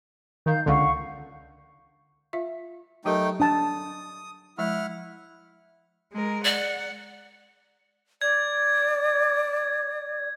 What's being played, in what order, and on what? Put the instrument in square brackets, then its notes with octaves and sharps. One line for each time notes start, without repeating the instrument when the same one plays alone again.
[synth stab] D#3 [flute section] F5 G6
[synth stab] C#2 D3 [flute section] F5 F#5 C#6
[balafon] F4 E5 F5
[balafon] F#3 G4 A#4 [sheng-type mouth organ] A3 D#4 G5
[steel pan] D4 A5 [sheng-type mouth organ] D#6
[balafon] F3 G#3 E5 [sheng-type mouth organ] E4 F#5 F6
[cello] G#3 A#4
[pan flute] D5 [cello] F#5
[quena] D5 [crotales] G#6